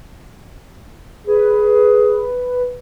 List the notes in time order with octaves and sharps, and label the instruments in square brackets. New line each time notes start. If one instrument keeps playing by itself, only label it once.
[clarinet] G#4 [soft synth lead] B4